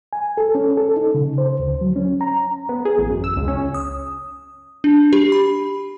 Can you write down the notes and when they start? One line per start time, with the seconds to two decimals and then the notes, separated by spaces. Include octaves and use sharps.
0.13 G#5
0.37 A4
0.55 C#4
0.77 A4
0.96 D#4
1.15 C#3
1.38 C5
1.59 D2
1.81 F#3
1.96 C#4
2.21 A#5
2.69 B3
2.85 G#4
2.98 A1
3.10 F#2
3.24 E6
3.37 C#2
3.48 C#4
3.74 D#6
4.84 D4
5.13 G4
5.32 B5